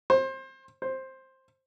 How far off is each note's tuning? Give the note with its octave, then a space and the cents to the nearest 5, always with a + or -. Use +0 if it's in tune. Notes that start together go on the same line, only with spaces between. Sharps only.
C5 +25
C5 +10